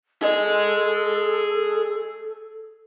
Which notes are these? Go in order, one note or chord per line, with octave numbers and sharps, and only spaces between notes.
G#4 A4 D#5